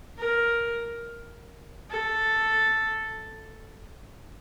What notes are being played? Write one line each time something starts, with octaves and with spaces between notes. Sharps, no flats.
A#4
A4